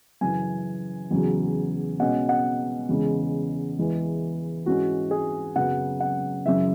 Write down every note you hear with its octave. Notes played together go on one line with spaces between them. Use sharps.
F#2 C#3 E3 G#5
E2 C#3 F#3
B2 G#3 C#4 F#5
F#5
E2 C#3 G#3
E2 E3 G#3
G#2 E3 G#3 C#4 F#4
G#4
F#2 C#3 F#3 B3 F#5
F#5
F#2 C#3 E3 E5